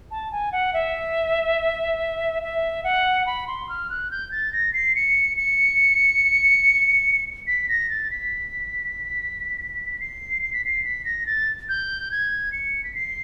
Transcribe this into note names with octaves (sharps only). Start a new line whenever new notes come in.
A5
G#5
F#5
E5
E5
F#5
B5
C6
F6
F#6
G6
A6
A#6
C7
C#7
C#7
B6
A#6
A6
B6
C7
C7
B6
C7
B6
A#6
A6
G6
G#6
C#7
B6
C7